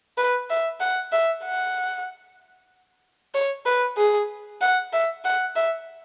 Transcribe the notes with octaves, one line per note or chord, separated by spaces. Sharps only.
B4
E5
F#5
E5
F#5
C#5
B4
G#4
F#5
E5
F#5
E5